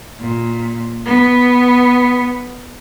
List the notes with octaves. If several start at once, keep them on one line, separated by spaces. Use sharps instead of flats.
A#2
B3